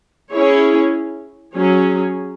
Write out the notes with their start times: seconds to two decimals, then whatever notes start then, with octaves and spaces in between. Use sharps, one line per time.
0.33 C#4 E4 G#4 C#5
1.55 F#3 C#4 G#4 C#5